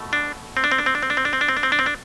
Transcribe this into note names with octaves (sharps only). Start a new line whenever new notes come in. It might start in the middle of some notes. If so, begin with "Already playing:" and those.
Already playing: B2 A3
D4
C4
D4
C4
D4
C4
D4
C4
D4
C4
D4
C4
D4
C4
D4
C4
D4
C4
D4